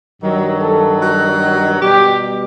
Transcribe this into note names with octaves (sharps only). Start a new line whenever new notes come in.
G2 D#3 F#3
A4
F#4
B2 G3 G4